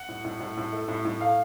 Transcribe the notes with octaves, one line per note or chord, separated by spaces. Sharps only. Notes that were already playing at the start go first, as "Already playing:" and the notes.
Already playing: F#5
A2
A2
A2
A2
A3
A2
A2
A3 F5